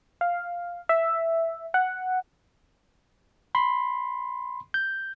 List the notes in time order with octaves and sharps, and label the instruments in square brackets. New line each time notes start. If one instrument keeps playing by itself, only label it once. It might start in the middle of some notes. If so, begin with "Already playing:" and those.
[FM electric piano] F5
E5
F#5
[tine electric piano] B5 C6
G6